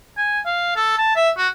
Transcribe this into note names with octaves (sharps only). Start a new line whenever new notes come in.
G#5
F5
A4
A5
E5
F#4